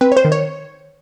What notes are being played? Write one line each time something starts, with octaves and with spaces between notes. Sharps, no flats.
C4 B4
C#5
C5
D#3
C#5